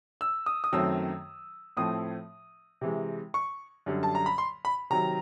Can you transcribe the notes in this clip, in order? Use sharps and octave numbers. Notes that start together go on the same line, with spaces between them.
E6
D#6
D#6
F#2 D#3 F#3 A3 C4 E6
A2 F3 A3 C4 D#6
C3 E3 G#3
C#6
F#2 D3 G3
A5
A#5
B5
C6
B5
C3 D#3 F#3 A#5